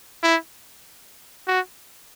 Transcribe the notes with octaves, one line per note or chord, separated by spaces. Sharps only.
E4
F#4